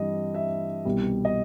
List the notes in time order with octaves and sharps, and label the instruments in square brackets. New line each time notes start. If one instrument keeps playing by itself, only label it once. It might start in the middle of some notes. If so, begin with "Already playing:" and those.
Already playing: [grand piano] G2 E3 G3 C4 D#5
E5
C2 B2 G3
D#5